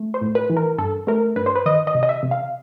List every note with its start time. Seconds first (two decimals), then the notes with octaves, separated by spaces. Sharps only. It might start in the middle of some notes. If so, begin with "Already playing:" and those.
Already playing: A3
0.14 C5
0.21 A2
0.35 B4
0.50 E3
0.57 A#4
0.78 G2 A4
1.07 A3 A#4
1.36 G2 B4
1.46 C5
1.55 B4
1.66 D#3 D#5
1.87 D#5
1.95 C3
2.03 D#5
2.09 E5
2.23 C3
2.31 F5